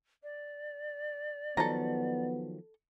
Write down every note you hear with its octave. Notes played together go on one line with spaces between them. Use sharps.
D5
D#3 F3 F#3 B3 A4 A#5